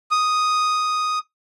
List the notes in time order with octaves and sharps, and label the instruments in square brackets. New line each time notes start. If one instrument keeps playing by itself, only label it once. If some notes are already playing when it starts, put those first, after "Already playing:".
[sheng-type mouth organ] D#6